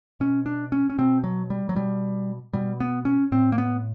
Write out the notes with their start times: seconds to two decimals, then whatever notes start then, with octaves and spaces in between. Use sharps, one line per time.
0.20 B2 C#4
0.46 D4
0.72 C#4
0.90 C#4
0.98 B2 C4
1.24 F#3
1.50 G3
1.69 F#3
1.76 B2 G3
2.53 B2 G3
2.80 B3
3.05 C#4
3.32 A2 C4
3.52 A#3
3.58 B3